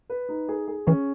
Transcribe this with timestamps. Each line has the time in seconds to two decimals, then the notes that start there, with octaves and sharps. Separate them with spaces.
0.10 B4
0.29 D#4
0.49 G#4
0.68 G#4
0.87 E3 C#4